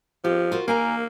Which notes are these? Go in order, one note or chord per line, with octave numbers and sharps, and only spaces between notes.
F3 G4
F4 F#4 A#4
A#3 A#4 G#5 A#5